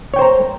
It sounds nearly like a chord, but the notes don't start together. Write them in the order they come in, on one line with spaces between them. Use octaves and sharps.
C#5 G5 C5 A#5